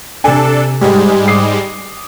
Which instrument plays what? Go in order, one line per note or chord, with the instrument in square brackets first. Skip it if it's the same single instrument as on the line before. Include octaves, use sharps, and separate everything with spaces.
[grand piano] C3 G#5 [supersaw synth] D4 A4
[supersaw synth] G#2 G3 G#3 [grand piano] G4 G#4
[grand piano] D6 D#6 C7